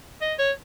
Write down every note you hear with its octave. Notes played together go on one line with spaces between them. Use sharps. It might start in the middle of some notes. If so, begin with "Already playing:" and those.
D#5
C#5